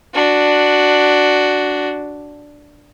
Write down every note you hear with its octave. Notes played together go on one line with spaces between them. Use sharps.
D4 F#4